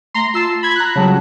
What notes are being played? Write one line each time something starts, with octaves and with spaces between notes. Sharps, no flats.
A3 A#5 C6
F4 A5 E6 C7
B5 G#6
A#5 F#6
C#3 F#3 G3 A5